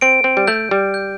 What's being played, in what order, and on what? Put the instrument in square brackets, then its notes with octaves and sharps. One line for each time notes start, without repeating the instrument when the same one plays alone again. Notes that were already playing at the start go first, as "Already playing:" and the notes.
[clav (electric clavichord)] C4 [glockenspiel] D7
[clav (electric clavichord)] C4
G3
[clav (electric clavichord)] A3 [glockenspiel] G6
[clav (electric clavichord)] G3
[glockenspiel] G6